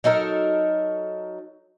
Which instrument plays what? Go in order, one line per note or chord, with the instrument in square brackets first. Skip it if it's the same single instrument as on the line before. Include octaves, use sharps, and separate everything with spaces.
[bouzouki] F#3 D#4 A4 A#4